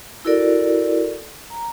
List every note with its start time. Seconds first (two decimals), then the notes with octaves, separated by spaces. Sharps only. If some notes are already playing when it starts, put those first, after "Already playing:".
0.25 E4 F#4 A4 A#4 D5
1.50 A#5